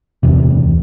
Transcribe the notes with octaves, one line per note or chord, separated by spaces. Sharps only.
D1 E2 C3